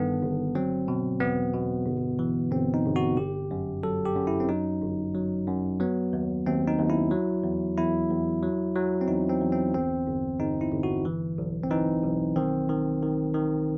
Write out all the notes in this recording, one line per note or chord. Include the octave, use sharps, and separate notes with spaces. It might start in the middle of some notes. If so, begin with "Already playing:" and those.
Already playing: G1 G2 D#3 B3 A4
G1
F#3 C4
B2
E2 B3
B2
G1
E3
G1 C4
D#4
G1
F#4
G1 G4
F#2
F#3 A4
G4
F#2
E4
C4
F#3 D#4
G1
F#3
F#2
F#3 B3
D#2
D#2 C4
D#4
D#2
E4
F#3
E2
E2 E4
E2
F#3
F#3
C4
E2 D#4
C4
E2
C4
G1 C4
G1
G1 D#4
E4
G1
F#4
E3
B1
C4
E3 D#4
B1
D#3 C4
D#3
D#3
D#3